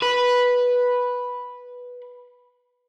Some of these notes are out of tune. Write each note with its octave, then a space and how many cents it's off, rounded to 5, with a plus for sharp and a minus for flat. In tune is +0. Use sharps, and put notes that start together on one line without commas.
B4 -5